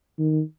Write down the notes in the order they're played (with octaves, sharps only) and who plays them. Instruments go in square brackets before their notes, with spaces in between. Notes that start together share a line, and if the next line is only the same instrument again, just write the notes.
[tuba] D#3